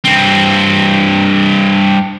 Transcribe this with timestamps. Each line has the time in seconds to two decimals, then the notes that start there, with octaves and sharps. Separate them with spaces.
0.04 G2 C4